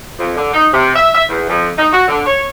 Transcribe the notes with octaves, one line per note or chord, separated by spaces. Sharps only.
F2
D3
D#4
C3
E5
E5
E2
F2
D#4
F#4
D3
C#5